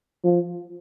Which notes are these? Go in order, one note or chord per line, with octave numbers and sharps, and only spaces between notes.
F3